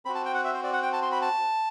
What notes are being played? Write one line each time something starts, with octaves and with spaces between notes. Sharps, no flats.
C4 F#4 B5
A5
G5
F#5
E5
C5
D5
F#5
G5
A5
C6
B5
A5